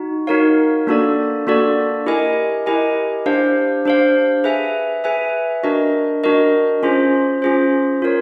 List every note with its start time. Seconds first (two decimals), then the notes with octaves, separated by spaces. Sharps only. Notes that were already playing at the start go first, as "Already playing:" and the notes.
Already playing: D#4 F#4
0.27 D#4 F#4 A#4 C#5 F5
0.87 A#3 D4 F#4 A4 D5
1.47 A#3 D4 F#4 A4 D5
2.06 E4 G4 A#4 D#5 G#5
2.66 E4 G4 A#4 D#5 G#5
3.26 D4 G4 C5 F5
3.85 D4 G4 C5 F5
4.44 G#4 B4 E5 G#5
5.04 G#4 B4 E5 G#5
5.63 D4 F#4 A#4 D#5
6.24 D4 F#4 A#4 D#5
6.83 C#4 F4 G#4 C5
7.42 C#4 F4 G#4 C5
8.02 F4 A#4 C#5